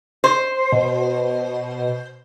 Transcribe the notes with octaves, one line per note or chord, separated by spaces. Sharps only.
C5
B2